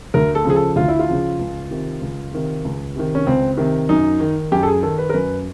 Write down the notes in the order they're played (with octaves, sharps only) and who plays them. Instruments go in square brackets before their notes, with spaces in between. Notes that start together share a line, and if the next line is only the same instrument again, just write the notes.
[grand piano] D2 A#4
A4
C#3 F3 G#4
A4
D2 F4
E4
F4
C#3 F3
C#2
C3 D#3
C#2
C3 D#3
C#2
C3 D#3
C#4
C#2 C4
C3 D#3
F#2 D#4
D#3
F#2 G4
A4
G#4
D#3 A4
B4
A#4
F#2 B4